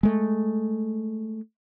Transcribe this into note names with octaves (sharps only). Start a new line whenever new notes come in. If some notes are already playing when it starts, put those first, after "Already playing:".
G#3 A3